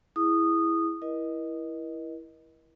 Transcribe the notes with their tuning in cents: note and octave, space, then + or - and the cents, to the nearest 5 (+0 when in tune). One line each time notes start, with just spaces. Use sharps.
E4 +0 G#4 +0 D#6 -15
E4 +0 A#4 +45 D#5 +0